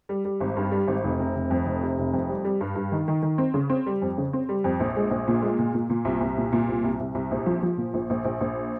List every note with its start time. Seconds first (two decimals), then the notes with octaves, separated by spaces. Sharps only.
0.09 G3
0.25 G3
0.41 G#1
0.57 G2
0.72 G3
0.87 G#1
1.04 F1
1.19 C3
1.35 F1
1.51 F2
1.66 F1
1.82 C3
1.98 F1
2.13 F2
2.29 G3
2.44 G3
2.61 G2
2.75 G2
2.92 D#3
3.08 D#3
3.22 D#3
3.38 C4
3.54 C#3
3.70 C4
3.86 G3
4.02 F2
4.18 C#3
4.33 C4
4.49 G3
4.64 F2
4.80 A#1
4.96 G#3
5.11 A#1
5.28 A#2
5.42 G#3
5.59 A#2
5.74 A#2
5.90 A#2
6.05 C2
6.21 C2
6.37 A#2
6.53 A#2
6.68 C2
6.84 C2
7.00 C2
7.15 C2
7.31 A#1
7.46 F3
7.63 F3
7.78 A#2
7.94 A#1
8.10 A#1
8.25 A#1
8.41 A#1